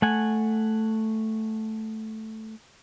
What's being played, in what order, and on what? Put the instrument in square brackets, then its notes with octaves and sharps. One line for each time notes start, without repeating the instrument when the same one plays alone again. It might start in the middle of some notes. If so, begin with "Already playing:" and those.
[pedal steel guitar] A3 F#5 G#5